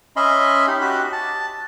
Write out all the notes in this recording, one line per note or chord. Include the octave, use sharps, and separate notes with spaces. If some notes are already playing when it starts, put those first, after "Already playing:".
C#4 D#5 E5 B5 C6
D#4 G4
F#4 G4 B5 F#6
A5